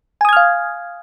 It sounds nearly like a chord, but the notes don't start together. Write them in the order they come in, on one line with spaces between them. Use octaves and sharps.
G#5 D#6 G#6 F6 F5